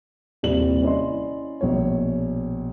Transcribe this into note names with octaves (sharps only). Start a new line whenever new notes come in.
D#1 C3 G3 E4 D5 F#7
C#4 E4 D5 D#5 C6
A#1 B2 C#5